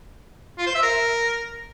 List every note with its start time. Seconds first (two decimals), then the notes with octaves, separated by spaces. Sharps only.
0.59 F4
0.67 C5
0.75 E5
0.83 A#4